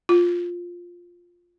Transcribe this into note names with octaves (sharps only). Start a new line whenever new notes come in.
F4